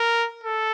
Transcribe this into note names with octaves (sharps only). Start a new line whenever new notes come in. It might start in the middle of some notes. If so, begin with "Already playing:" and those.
Already playing: A#4
A4